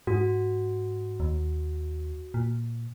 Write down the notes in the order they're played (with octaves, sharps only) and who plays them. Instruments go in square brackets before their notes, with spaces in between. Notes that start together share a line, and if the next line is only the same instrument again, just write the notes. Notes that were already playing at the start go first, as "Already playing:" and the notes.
[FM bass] G#2 [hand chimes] F#4
[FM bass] D#2
A#2